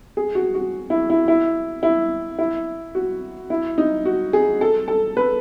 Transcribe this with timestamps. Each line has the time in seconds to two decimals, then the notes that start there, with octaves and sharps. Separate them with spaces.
0.17 G#4
0.35 F#4
0.54 F#4
0.90 E4
1.10 E4
1.28 E4
1.83 E4
2.39 E4
2.95 F#4
3.50 E4
3.78 D#4
4.05 F#4
4.33 G#4
4.61 A4
4.88 A4
5.17 B4